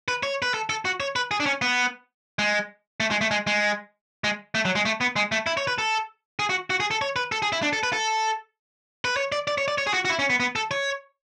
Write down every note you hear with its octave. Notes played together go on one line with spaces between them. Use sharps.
B4
C#5
B4
A4
A4
F#4
C#5
B4
G#4
D4
C#4
B3
G#3
A3
G#3
A3
G#3
G#3
G#3
A3
F#3
G#3
A3
B3
G#3
A3
E4
C#5
B4
A4
G#4
F#4
F#4
G#4
A4
C#5
B4
A4
G#4
E4
D4
A4
B4
A4
B4
C#5
D5
D5
C#5
D5
C#5
G#4
F#4
F#4
E4
C#4
B3
B3
A4
C#5